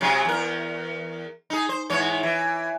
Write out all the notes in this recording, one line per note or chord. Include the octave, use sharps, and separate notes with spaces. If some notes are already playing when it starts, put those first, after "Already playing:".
C3 F#3 G#3
E2 A#4
D#4 G#4
C5
G#2 E3 C#5
E3